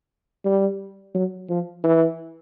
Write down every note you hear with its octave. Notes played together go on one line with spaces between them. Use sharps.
G3
F#3
F3
E3